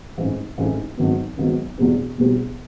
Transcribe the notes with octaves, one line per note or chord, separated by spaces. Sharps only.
A1 G#2 E3 A3 C4
A1 G#2 E3 A3 C4
G#1 G#2 D#3 F#3 B3
G#1 G#2 D#3 F#3 B3
E1 E2 B2 G3 C4
E1 E2 B2 G3 C4